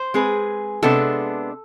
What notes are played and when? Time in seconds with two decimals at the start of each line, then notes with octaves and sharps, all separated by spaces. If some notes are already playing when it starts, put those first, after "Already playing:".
Already playing: C5
0.14 G#3 C4 G#4 B4
0.83 C3 G#3 B3 D4 A4